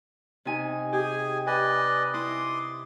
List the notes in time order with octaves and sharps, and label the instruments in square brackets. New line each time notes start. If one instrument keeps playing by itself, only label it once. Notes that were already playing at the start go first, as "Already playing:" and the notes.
[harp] C3 D#4 G#5
[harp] G4 [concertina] G#4 G#5
[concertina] B4 D5 D#5 [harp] G#5
[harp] E4 [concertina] C6 D6 D#6